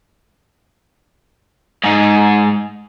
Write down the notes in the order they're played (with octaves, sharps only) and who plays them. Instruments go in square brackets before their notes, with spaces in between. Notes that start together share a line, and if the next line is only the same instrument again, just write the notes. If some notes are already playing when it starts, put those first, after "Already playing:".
[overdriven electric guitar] G#2 D#4